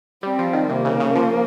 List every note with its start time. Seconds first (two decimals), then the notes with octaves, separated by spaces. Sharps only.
0.23 G3 C4
0.39 F3
0.53 D#3
0.69 C3 A#3
0.85 C#3
1.00 C#3
1.15 F3